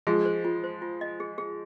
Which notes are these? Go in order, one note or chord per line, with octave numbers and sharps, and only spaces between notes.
F3 G#3 G#4
C5
F4
C5
F4
D#5
G#4
G#4